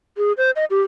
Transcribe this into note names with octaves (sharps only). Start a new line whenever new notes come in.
G#4
C5
D#5
G4